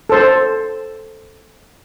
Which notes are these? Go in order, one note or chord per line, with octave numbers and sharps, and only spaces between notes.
A4 C5